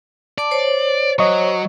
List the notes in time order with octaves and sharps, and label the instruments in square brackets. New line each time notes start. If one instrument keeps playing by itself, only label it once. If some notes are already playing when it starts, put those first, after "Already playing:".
[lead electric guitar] D5 [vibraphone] A5 D6
[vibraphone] C5 C#5
[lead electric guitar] F#3 [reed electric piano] D#5 C#6